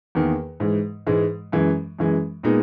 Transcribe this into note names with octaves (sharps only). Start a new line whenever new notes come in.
E2 D#3 A#3
G#2 E3 G#3
G#2 E3 G#3
F#2 E3 G#3
F#2 E3 G#3
A#2 G#3 B3 D#4